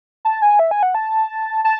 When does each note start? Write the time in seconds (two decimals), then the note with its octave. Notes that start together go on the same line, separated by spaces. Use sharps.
0.25 A5
0.42 G#5
0.59 E5
0.71 G#5
0.83 F#5
0.95 A5
1.64 A5